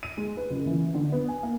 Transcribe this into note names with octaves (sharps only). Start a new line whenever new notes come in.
D#7
G#3
B4
F#1
E3
D3
B3
G#5
A#3